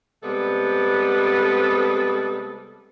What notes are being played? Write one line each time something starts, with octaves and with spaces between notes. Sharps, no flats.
C3 G3 G#3 B3 A4